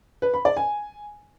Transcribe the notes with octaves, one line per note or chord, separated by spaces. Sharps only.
B4
B5
D5
G#5